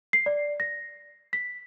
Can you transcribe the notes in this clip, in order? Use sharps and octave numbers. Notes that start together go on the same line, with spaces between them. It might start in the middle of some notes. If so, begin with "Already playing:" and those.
C7
D5
A#6
B6